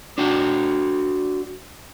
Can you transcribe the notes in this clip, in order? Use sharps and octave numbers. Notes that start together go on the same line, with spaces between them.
D4 F#4 G5